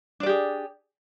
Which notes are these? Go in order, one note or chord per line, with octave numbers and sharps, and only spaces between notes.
D4 G4 G#4 D5